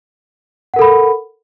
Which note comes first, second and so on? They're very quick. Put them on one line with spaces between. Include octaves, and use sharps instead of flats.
F#5 A#4 A4 B5